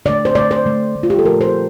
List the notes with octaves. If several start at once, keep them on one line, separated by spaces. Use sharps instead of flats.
D3 A3 D5
C5
D3 A3 D5
C5
D3 A3
D3 A3
F4
G4
A4
A#2 F3 A3 A#4
C5